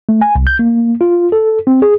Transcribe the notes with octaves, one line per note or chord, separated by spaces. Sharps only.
A3
G#5
C2
G6
A#3
F4
A4
C4
G#4